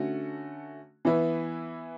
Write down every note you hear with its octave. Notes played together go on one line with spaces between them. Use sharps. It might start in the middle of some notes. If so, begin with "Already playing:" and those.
Already playing: D3 A3 C#4 F#4
E3 B3 E4 B4